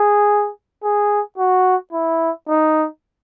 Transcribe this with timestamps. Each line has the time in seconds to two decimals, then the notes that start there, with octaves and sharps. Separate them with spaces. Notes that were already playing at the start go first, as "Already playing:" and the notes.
Already playing: G#4
0.83 G#4
1.38 F#4
1.93 E4
2.48 D#4